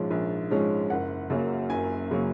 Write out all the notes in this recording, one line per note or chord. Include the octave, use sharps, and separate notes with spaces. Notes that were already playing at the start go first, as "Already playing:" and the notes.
Already playing: A#1 G#2 F3 G#3 C#4
A#1
G#2 F3 G#3 C#4
F#1 F#5
F#2 C#3 F#3 A#3
F#1 G#5
C#3 F#3 A#3